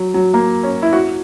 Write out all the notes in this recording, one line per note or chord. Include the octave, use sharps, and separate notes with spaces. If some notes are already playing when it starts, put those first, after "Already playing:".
Already playing: F#3
F#3
A#3
C#4
E4
F#4